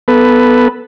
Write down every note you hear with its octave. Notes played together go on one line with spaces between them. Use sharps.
B3 A4 B4